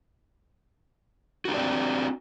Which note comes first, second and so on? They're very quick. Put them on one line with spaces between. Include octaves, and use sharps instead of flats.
F#4 D4 G4 D5 C4